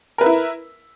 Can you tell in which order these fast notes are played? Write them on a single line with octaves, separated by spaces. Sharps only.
A#4 B4 E5 E4